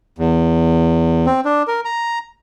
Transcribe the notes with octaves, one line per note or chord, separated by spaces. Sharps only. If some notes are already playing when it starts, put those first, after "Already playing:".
E2
C4
D4
A#4
A#5